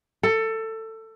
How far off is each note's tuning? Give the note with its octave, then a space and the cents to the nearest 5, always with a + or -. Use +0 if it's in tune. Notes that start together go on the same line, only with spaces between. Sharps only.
A4 +20